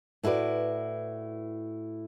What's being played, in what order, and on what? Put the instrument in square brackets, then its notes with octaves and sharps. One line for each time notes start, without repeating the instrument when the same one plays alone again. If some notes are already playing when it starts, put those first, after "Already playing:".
[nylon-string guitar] A2 E4 F#4 B4 D5